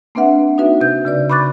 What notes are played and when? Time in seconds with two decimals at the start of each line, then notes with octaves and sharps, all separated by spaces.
0.15 A#3 C4 D4 B4 E5 F#5
0.58 D#4 F#4 B4 E5
0.81 C3 G6
1.05 C#3 B4 D5
1.30 B5 C#6 D6 F#6 A6